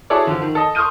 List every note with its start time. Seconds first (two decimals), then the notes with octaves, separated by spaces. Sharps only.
0.10 E4 F#4 G#4 A4 C#5 D5
0.27 D3 F3
0.42 D#3
0.55 A4 D#5
0.75 C6 C#6 D#6 F6 G6 D#7